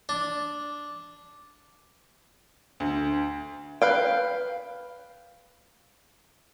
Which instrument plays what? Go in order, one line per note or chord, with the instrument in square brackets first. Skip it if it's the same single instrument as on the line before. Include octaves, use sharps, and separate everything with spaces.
[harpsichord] D4
[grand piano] D2
[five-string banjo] B4 F5 G5